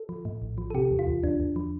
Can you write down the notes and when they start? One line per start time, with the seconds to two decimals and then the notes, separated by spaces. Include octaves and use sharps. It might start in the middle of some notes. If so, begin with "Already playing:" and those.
Already playing: A4
0.09 F3
0.25 A2
0.42 A#1
0.58 F3
0.70 A4
0.74 C3 G4
0.91 E2
0.99 F4
1.07 E2
1.23 E2 D4
1.40 E2
1.56 F3